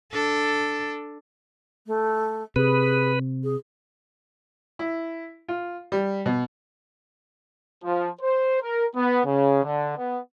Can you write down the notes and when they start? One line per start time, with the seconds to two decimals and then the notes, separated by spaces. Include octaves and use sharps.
0.13 D4 A4
1.87 A3
2.56 C3 G#4 B4
3.44 G#4
4.79 E4
5.49 F4
5.92 G3
6.26 B2
7.84 F3
8.21 C5
8.62 A#4
8.96 B3
9.26 C#3
9.64 D3
9.97 B3